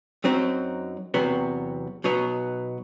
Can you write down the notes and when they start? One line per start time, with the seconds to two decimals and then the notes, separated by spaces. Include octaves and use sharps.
0.24 F#2 F#3 C4 D#4
1.14 E2 C3 F#3 B3
2.04 B2 F#3 B3 D#4